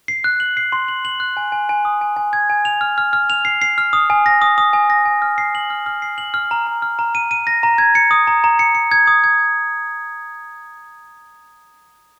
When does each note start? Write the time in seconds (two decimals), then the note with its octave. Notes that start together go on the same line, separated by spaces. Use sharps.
0.08 C7
0.24 F#6
0.40 F#7
0.57 C7
0.72 C6
0.88 F#7
1.05 F#7
1.20 F#6
1.37 G#5
1.52 G#5
1.69 G#5
1.85 D#6
2.01 G#5
2.17 G#5
2.33 G#6
2.50 G#5
2.65 F7
2.81 F6
2.98 F6
3.13 F6
3.30 F7
3.45 C7
3.62 C7
3.78 F6
3.93 D#6
4.10 G#5
4.26 A#6
4.42 D#6
4.58 D#6
4.73 G#5
4.90 A#6
5.05 G#5
5.22 F6
5.38 C7
5.55 F#7
5.70 F6
5.86 F6
6.02 C7
6.18 F#7
6.34 F6
6.51 A#5
6.67 A#5
6.82 F6
6.99 A#5
7.15 D#7
7.31 D#7
7.47 A#6
7.63 A#5
7.78 G#6
7.95 C#7
8.11 D#6
8.27 A#5
8.44 A#5
8.59 C#7
8.75 C#7
8.91 G#6
9.07 D#6
9.24 G#6